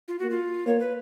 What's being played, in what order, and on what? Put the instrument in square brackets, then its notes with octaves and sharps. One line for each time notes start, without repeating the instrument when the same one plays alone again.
[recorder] F4
[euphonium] A#3 [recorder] F#4
[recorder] F4
[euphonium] A#3 [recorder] C#5
[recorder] B4